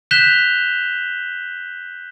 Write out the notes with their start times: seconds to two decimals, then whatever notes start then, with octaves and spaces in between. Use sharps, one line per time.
0.11 F#6 G6 B6 E7 F7 G7